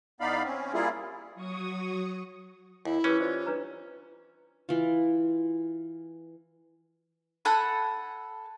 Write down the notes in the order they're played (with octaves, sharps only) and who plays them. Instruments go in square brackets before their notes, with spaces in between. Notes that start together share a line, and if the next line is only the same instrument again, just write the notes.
[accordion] E2 B3 D#4 D5 F5 B5
C4 C#4
G3 A#3 E4 F4 G#4
[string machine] F#3 C#6 D#6
[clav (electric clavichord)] D#2 [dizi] E4
[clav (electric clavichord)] E3 C#4 [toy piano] G4 B4 C#5
[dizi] F4 [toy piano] C5 D5
[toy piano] D4 B4 A#5
[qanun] E3 F4
[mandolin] A4 F#5 G#5 B5